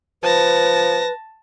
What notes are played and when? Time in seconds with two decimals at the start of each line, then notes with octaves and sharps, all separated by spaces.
0.23 F3 B4 A5 A#6